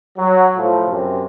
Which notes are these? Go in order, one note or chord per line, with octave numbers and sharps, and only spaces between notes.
F#3
A2 F3
F#2 C3